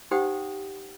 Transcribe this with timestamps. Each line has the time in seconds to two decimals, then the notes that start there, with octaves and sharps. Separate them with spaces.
0.11 D#4 G4 C5 F#5 G5 D#6